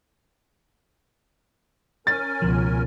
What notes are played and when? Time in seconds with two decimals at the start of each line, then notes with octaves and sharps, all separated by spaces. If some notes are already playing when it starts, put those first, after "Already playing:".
2.07 C#4 A#4 G#5 A6
2.42 C#2 B2 F3